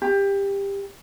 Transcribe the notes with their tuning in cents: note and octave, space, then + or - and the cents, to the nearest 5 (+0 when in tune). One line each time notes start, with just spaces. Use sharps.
G4 +20